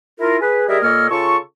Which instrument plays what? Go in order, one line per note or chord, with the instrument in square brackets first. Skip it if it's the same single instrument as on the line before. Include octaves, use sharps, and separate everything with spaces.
[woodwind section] E4 F4 A#4
G#4 B4
G3 G4 G#4 A#4 D#5 E5
A#2 A#3 A4 C#5 D#5 F6
C#3 F4 A4 A5 C#6